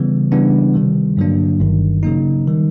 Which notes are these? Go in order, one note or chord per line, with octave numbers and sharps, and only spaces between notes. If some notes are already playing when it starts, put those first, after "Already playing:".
Already playing: C#3 E3 G3 B3
C#3 E3 G3 B3 D4
C3 D#3 G3
G2 D3 F#3 A#3 D4
G1 G2 D#3
C#3 F#3 A#3 D#4
D#3 G3